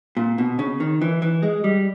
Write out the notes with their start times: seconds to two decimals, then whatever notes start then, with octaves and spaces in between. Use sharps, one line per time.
0.17 A#2
0.38 B2
0.59 C#3
0.80 D#3
1.02 E3
1.22 E3
1.43 G#3
1.64 G3